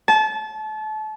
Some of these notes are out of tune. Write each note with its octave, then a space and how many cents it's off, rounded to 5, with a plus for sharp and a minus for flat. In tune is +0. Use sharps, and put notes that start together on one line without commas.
A5 -30